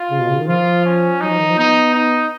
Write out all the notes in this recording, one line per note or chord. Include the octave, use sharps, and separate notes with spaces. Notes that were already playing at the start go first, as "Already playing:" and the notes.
Already playing: F4
C#3
B2
C#3
D#3
F3 F4
C#4
F#3 D#4
F3
D#3
F3
B3 D#4
D#4